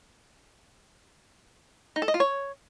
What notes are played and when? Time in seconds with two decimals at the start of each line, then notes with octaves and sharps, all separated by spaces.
1.96 D#4
2.02 A4
2.08 D#5
2.14 F4
2.20 C#5